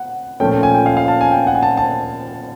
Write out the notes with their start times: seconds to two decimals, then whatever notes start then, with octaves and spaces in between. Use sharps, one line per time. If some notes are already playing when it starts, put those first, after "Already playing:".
Already playing: F#5
0.40 A#2 F3 A3 C#4 G5
0.51 G5
0.63 G#5
0.75 G5
0.86 F5
0.97 F5
1.08 A5
1.21 G#5
1.31 G5
1.47 F#5
1.55 G#5
1.63 A5
1.77 A5